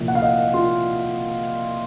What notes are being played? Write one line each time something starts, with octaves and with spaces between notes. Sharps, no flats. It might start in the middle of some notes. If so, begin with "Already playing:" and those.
Already playing: C2 A#2 F3
F#5
F5
D#5
F4